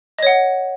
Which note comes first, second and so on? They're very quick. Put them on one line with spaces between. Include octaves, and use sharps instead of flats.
D#5 C#5 F#5